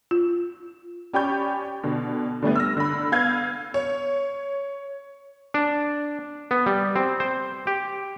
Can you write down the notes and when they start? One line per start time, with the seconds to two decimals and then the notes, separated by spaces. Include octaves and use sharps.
0.11 F4
1.13 C#4 G4 D5 B5 C#6 G6
1.83 B2 D3
2.42 D3 G3 A3 B3
2.56 E6 F6 A#6
2.77 D3 B5
3.12 B3 F5 G6 G#6
3.74 C#5
5.54 D4
6.51 B3
6.66 G3
6.96 C4
7.20 C5
7.67 G4